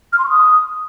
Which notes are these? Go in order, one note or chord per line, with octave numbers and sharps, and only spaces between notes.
F6
C6
C#6
D#6